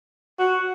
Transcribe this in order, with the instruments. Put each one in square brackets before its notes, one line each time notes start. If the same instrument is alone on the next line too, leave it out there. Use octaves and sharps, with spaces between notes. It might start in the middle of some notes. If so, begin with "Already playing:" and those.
[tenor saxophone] F#4